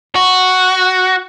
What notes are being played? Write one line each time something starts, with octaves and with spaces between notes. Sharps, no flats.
F#4